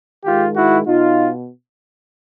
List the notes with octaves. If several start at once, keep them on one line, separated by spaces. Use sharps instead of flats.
G#2 D#3 G#3 F4 G4
E4 F#4
B2 D#4 F4